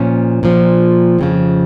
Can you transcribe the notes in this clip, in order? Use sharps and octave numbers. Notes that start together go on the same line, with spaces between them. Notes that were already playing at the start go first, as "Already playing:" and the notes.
Already playing: A#2 F3 C#4
A#2 F3
F2 C#3 F3